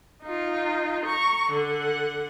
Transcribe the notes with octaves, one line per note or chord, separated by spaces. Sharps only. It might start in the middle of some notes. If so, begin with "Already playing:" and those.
D#4 F4
A#5 C#6
D3 F#5